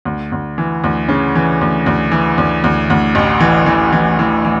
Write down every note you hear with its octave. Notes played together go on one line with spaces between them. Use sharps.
D2
D2
E3
D2
C#3
E3
D2
D2
E3
D2
D2
D2
A1
E3
E3
E3
E3
E3